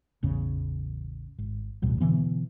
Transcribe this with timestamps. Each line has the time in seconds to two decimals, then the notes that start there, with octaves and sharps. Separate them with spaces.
0.23 A1 E2 C#3
1.38 G#1
1.82 A1 D2 B2 G3
2.00 B2 D3 E3 B3